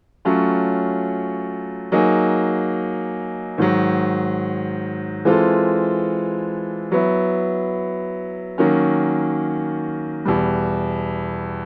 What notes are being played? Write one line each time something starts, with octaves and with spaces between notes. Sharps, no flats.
F#3 A3 C#4 F4
F#3 A#3 D#4 G#4
G#2 D#3 F#3
E3 G#3 C4 F4 A4
F#3 B3 E4
D#3 F#3 A#3 C#4
E2 B2 G3